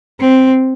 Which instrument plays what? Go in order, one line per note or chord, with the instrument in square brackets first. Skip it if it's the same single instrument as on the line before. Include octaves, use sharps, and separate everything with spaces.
[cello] C4